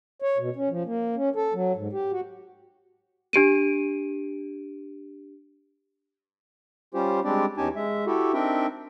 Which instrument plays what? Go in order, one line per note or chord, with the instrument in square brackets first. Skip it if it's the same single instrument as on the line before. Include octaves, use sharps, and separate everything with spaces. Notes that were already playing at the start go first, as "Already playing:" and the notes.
[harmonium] C#5
B2
C#4
F3
A#3
C#4
A4
F#3
G#2
G4
F#4
[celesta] D4 G4 D7 D#7
[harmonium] G3 C#4 F4 G4 C5
G3 G#3 C4 D4 G4 D5
E2 C#4 D#4 G4 G#5 A5
G#3 E5
E4 F#4 G4 A4
C4 D4 D#4 A#4 E5 G5